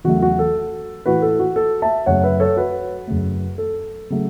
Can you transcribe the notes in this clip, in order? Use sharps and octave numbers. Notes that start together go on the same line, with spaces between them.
E2 C#3 F#3 A3 F#4
F#4
A4
A2 E3 A3 F#4 B4
A4
F#4
A4
E5 A5
F#2 C#3 F#3 A3 C#5 F#5
B4 E5
A4 C#5
F#4 B4
F#2 C#3 A3
A4
C#3 F#3 A3